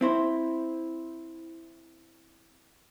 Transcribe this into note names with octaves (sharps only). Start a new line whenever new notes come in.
C4 E4 C5